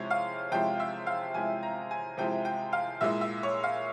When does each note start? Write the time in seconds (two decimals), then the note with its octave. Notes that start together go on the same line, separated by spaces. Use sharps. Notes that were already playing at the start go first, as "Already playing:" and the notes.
Already playing: C3 F3 G#3 E4 C#5
0.10 F5
0.52 C3 F3 G#3 E4 G5
0.80 E5
1.07 F5
1.34 C3 F3 G#3 E4 G#5
1.63 A#5
1.91 G#5
2.17 C3 F3 G#3 E4 G5
2.45 G5
2.73 F5
3.01 A#2 G#3 E4 E5
3.21 E5
3.43 C#5
3.63 F5